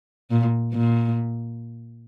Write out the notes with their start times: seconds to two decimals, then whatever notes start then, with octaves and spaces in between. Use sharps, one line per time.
0.31 A#2
0.73 A#2